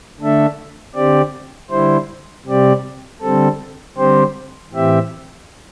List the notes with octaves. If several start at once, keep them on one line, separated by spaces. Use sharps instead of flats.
D3 A3 D4 A4 E5
D3 C4 G4 D5
D3 G3 E4 C5
C3 G3 C4 G4 D5
D3 G3 C4 A4
D3 G3 C4 G4 C5
A2 E3 C4 G4 E5